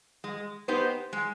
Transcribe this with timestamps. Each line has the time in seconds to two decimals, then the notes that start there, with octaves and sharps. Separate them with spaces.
0.24 G#3
0.68 B3 D#4 G4 C5
1.13 G#3